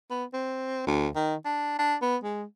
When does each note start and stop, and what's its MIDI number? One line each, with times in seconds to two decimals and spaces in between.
0.10 0.24 59
0.33 0.83 60
0.86 1.08 38
1.15 1.35 51
1.45 1.76 62
1.78 1.95 62
2.02 2.16 59
2.24 2.44 56